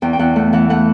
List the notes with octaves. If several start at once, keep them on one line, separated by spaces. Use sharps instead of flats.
E2 G5
G5
E2 F#5
A3 F#5
E3 F#5
A3 F#5